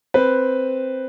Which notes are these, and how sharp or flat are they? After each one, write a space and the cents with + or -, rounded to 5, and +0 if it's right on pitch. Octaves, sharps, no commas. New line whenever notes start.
C4 +0 B4 +0